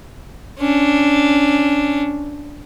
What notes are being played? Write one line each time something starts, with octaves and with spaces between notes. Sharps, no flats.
C#4 D4